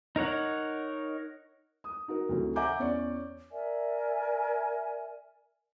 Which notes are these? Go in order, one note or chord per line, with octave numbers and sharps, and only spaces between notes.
D#4 A#4 C#5 F#5
D#6
D#4 F#4 A#4
D2 C3 E3 F#3
E5 F#5 G#5 A#5 D6 G6
E2 C#4 D5 C#6
A#4 D5 E5 G#5